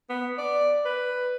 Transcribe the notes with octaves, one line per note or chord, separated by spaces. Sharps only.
B3
D5
B4